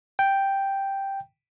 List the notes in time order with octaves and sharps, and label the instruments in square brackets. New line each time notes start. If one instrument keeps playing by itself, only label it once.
[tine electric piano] G5